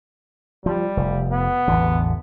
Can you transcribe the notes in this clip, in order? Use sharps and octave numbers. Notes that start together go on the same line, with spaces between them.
F3 G3
F1
B3
A1 E2 D3